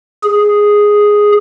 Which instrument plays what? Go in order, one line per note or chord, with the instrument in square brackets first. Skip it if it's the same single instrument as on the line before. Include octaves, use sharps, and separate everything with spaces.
[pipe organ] G#4